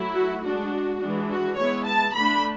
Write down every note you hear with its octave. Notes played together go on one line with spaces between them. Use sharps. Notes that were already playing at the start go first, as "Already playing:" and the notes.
Already playing: F#3 A3 E4
F#4
G#3 D4 F#4
E3 G#3 D4
F#4
G#3 B3 E4 C#5
A5
D3 A3 D4 B5